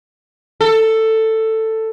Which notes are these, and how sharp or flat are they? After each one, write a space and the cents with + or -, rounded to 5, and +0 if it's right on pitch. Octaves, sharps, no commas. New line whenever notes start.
A4 +10